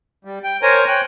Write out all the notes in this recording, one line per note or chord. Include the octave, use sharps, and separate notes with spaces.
G3
G5
A#4 C5 C#5 G#5 A#5
C#5 G5 F#6